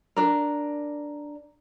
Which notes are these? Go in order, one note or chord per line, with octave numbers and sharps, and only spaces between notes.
D4 A#4